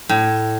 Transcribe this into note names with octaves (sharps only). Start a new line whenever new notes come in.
A2